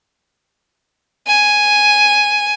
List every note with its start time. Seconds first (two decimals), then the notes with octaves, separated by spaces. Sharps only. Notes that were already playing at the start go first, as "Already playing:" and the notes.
1.27 G#5